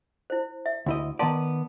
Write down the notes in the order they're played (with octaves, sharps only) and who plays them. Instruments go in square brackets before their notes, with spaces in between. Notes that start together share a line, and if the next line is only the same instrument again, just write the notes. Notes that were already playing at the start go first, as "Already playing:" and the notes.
[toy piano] E4 C5
E5
[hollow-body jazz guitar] D2 E4 D#5
[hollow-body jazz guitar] D#3 B3 D5 [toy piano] F5 A5 C6